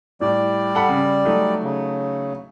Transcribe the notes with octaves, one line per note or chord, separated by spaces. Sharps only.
A2 G3 D5
A4 F#5 B5
C#3
F#3 A3 D#4
C#3